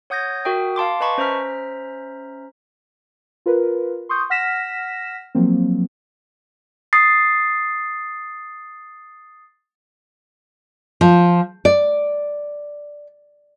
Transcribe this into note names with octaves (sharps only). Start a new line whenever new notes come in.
C#5 F#5 D#6 G6 G#6 A#6
F#4 A#4 E5 G5 D#6
F5 A5 C6 D6
B4 D#5 G#5 A5 B5 C#6
C#4 C5 E5 A#5 F6 B6
F4 A#4 B4
C6 C#6 D#6 G6
F#5 F6 A#6 B6 E7
F3 F#3 A#3 C4
D#6 A6 C7
F3
D5